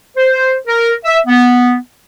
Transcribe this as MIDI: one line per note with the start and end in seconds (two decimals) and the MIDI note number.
0.17 0.54 72
0.67 0.92 70
1.05 1.18 76
1.27 1.75 59